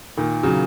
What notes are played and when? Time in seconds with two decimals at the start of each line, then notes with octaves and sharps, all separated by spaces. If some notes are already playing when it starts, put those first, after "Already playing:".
0.17 A#2 D#3
0.43 C#3 F#3